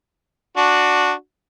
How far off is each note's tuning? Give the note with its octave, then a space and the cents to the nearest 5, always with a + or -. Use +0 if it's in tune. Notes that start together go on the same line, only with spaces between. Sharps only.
D4 +0 F#4 -10